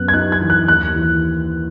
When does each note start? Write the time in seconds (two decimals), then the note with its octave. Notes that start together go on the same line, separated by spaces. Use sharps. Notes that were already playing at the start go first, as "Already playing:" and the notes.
Already playing: F#2 B3 F#6
0.08 G#6
0.14 D#4 F#6
0.32 G#6
0.41 E3
0.50 F#6
0.68 D#2 F#6
0.96 E3